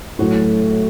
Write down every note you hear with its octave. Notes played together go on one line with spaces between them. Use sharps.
A2 F#3 A3 F#4